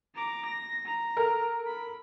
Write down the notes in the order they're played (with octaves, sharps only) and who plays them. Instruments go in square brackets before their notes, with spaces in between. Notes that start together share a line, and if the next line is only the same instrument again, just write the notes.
[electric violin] A#5 D6
A#6
A#5
[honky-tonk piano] A4 A#4
[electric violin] B5